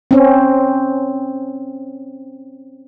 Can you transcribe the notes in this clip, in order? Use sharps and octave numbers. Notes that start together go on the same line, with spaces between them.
C4 C#4